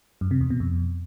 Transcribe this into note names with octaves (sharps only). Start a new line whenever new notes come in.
F#2
C3
E2
B2
F2